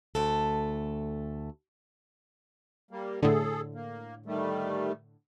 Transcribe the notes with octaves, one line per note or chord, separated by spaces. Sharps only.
D2 A3 A4
G3 A#3
A2 D3 G#4 A4
A#3
D#3 G3 A3